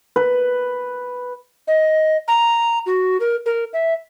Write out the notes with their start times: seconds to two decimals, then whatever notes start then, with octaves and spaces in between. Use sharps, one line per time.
0.16 B4
1.68 D#5
2.28 A#5
2.86 F#4
3.20 A#4
3.46 A#4
3.73 E5